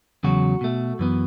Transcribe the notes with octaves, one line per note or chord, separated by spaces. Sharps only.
E2 C#3 F#3 F#4
B2 A3
F#2 E3 B3